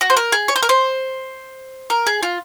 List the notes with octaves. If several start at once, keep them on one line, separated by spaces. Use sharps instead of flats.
F#4
C5
A#4
G#4
C#5
C5
A#4
C5
A#4
G#4
F4